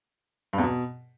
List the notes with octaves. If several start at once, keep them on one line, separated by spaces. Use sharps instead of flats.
G2
E2
B2